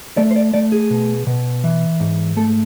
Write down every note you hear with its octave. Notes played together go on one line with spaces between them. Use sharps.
A3 D5
C5
D5
A3 D5
G#4
B2
B2
E3
G#2
A3 A4